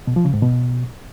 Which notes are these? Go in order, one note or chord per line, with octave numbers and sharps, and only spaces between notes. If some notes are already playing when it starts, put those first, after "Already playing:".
B2
F3
C#3
G#2
B2